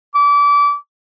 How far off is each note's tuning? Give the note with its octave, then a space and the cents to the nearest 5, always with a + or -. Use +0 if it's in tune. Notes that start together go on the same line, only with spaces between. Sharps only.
D6 -30